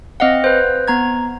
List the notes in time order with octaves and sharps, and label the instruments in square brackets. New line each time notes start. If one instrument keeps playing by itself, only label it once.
[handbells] C4 D#5 F5 F#5
B4 C5
B3 A#5 G#6